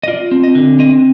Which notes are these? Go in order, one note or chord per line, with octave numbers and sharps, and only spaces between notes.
D#5
F4 D5
C4
D#5
D3
C4 D#5